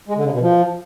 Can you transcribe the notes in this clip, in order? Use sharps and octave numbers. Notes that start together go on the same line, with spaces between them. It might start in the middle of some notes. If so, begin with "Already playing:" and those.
G#3
D3
C#3
B2
F3